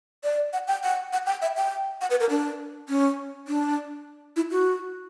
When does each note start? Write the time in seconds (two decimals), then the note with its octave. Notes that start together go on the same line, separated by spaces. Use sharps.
0.24 D5
0.53 F#5
0.68 G5
0.83 F#5
1.13 F#5
1.26 G5
1.42 E5
1.57 G5
2.01 F#5
2.10 B4
2.20 A#4
2.30 D4
2.89 C#4
3.48 D4
4.36 E4
4.51 F#4